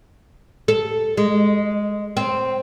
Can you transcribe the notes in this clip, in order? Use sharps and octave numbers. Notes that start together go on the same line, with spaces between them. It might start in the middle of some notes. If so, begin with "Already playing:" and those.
A4
G#3
C4